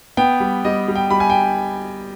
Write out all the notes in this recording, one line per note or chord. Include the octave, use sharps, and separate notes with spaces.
B3 G5
G3
G3 D#5
G3
G5
G3 B5
G#5
G5